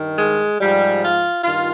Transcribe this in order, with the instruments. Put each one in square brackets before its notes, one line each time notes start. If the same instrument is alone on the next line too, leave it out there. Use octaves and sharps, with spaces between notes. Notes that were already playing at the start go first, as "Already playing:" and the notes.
Already playing: [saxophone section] G2 D#3
G#3
G#2 F3 G3
F4
G2 D#3 F4